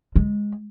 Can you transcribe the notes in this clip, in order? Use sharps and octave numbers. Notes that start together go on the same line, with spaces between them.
G#3